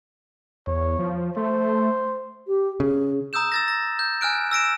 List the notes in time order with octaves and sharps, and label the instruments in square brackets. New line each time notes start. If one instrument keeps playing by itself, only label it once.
[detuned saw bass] E2 [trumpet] C#5
[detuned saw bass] F3
[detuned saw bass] A3 [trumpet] C5
[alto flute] G4
[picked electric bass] C#3 [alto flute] G#4
[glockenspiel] A#5 D#6 E6 G6 E7
E6 A6 A#6
A#6
G6
G#5 F6 F#6 D7
E6 A#6 D7 E7